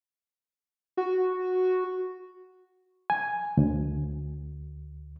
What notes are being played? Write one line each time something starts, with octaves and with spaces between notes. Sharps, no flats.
F#4
G#5
D2